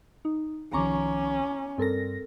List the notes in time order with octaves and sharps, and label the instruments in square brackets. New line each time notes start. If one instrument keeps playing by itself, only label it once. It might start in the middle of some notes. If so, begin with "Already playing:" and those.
[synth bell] D#4
[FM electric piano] C2 D#3 F3 [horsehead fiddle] C#4 [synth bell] A#5 C#6 D6
[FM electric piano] G2 A#6 [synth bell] C4 A4 A#4